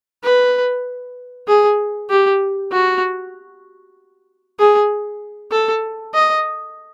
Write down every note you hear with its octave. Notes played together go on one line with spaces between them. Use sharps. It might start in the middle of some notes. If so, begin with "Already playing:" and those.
B4
G#4
G4
F#4
G#4
A4
D#5